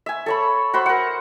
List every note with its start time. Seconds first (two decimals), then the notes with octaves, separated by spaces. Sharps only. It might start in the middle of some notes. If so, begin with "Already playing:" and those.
0.06 E5 G#5
0.26 A4 C#5 B5
0.74 F#4 C5 B5
0.86 A#4 F#5